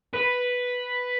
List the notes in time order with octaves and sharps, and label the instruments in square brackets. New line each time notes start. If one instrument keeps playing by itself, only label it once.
[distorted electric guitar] B4